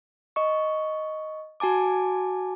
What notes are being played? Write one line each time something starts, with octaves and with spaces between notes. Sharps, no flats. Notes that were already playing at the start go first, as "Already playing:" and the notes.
D#5 C#6
F#4 G#5 A5 D6